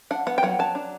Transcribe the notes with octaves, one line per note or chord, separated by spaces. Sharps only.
D4 F#5
B3 F#5
G5
F#3 F#5
F#3 A5
D4